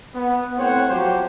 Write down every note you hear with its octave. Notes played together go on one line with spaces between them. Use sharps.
B3
A2 C4 C5 C#5 F#5
F3 F#3 F#4 G4 C5